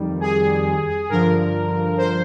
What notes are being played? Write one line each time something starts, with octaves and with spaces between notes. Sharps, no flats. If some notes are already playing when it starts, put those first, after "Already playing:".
Already playing: F2 D#3 G3
G#4
G2 D3 F3 A#4
C5